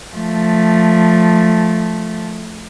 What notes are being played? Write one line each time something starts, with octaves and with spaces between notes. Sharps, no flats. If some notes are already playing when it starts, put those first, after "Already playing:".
F3 A3